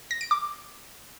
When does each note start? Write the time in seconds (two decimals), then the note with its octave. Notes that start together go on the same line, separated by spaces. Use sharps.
0.11 A#6
0.21 D7
0.31 D6